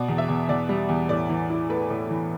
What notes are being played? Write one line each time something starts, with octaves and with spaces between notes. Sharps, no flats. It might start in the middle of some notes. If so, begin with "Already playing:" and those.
Already playing: B2 B3 D5
E2
E5
E2
E2 D5
G3
E2
A2 D5
E3
E4
A3 B4
A2
E3